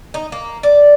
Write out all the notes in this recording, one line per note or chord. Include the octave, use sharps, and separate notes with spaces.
D#4
A#3
D5